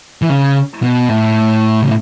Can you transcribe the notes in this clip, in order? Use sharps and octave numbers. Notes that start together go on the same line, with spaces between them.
E3
C#3
B2
A2
C#3